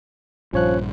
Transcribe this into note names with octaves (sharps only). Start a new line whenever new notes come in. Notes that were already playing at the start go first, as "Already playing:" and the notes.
A#1 G2 F3 C#4 C#5 F#6